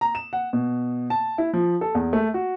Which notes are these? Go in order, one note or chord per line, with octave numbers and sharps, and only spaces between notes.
A#5
E7
F#5
B2
A5
E4
F3
A4
E2
A3
F#4